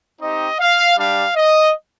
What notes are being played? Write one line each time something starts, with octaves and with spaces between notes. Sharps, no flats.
C4 D#4 G4 D#5
F5
G3 D4 G4 F5
D#5